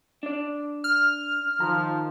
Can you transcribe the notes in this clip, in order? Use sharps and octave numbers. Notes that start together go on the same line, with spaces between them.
D4 D5
F6
D#3 F3 A#5